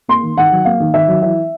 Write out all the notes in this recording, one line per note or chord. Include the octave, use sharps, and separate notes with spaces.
A#3 C6
D#3
D#3 F#5
F#3
A#3 F5
D#3
D#3 E5
F#3
E3 E5